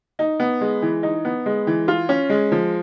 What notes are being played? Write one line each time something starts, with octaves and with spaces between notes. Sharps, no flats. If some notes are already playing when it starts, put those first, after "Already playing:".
D#4
B3
G#3
E3
D#4
B3
G#3
E3
F4
C#4
G#3
F3